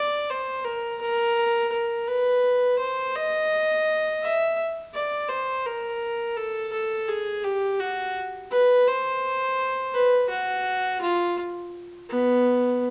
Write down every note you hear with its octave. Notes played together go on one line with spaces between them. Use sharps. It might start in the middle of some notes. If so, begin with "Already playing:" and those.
Already playing: D5
C5
A#4
A#4
A#4
B4
C5
D#5
E5
D5
C5
A#4
A4
A4
G#4
G4
F#4
B4
C5
B4
F#4
F4
B3